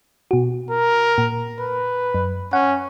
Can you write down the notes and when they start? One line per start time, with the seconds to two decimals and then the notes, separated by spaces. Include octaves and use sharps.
0.31 B2 F#4
0.70 A#4
1.18 A#2
1.60 B4
2.14 F#2
2.53 C#4 F#5